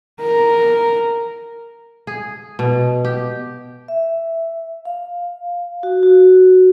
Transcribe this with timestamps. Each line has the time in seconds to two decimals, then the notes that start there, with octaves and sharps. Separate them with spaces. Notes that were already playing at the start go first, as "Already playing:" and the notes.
0.21 A#4
2.07 G#4
2.59 B2
3.05 G4
3.88 E5
4.85 F5
5.83 F#4
6.03 F#4